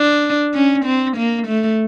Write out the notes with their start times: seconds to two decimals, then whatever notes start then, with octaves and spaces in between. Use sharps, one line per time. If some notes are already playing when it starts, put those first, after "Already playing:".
Already playing: D4
0.54 C#4
0.85 C4
1.17 A#3
1.47 A3